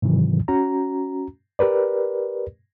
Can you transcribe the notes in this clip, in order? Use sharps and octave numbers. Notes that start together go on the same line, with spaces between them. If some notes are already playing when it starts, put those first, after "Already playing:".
G#2 C3 D#3 E3 F#3
C#4 F#4 A#5
G4 A#4 B4 D5